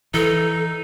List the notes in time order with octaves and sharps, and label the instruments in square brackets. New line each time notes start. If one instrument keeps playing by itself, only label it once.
[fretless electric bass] E3 [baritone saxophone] D#4 [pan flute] A4